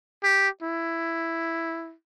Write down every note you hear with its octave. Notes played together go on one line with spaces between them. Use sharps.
G4
E4